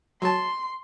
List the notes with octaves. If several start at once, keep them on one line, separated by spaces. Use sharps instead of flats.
F#3 A5 C6